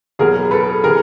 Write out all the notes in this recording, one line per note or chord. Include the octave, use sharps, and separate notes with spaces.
E2 B2 F#3 G#4 A#4
A4 B4
C3 E3 G#4 A#4